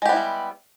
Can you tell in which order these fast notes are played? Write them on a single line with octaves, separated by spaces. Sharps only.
G#3 G4 B3 E4 G3